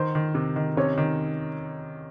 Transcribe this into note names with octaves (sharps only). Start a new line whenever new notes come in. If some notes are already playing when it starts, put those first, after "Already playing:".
Already playing: D#3 C5 C6
D#3
C3
D#3
C3 C#4 C#5
D#3